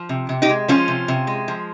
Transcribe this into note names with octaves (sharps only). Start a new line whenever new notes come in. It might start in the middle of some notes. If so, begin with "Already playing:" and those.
Already playing: F3
C3
C3
D#4 G4
G#3
F3 C#4 F4
C3
C3
G#3
F3